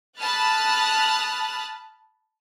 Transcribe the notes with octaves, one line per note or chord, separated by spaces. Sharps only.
A5 B5 D#6 F6 F#6 A6